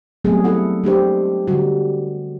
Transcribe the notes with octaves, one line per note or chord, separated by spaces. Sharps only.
F#3 G3 A3 B3 C4 G#4
E4 A4 F#5
G#3 D4 G4 C5
D3 G3 F#4